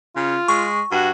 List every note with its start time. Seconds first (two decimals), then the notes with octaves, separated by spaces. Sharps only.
0.16 C#3 F4
0.48 G#3 C#6
0.92 G2 F#4